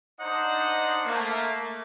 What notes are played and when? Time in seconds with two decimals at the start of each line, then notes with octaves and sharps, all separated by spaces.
0.20 D4 D#4 C5 D#5 F#5
1.05 A3 A#3